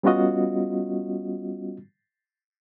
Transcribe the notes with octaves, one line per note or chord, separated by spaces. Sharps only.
G3 B3 C#4 F4 F#4 D#5